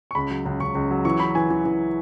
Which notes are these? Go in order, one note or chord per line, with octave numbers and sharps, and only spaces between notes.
C#6
C#2 B5
F#3
C#2
C#2 C#6
C#2
F#3
E3 C#6
E3 B5
E3 G#5
E3
E3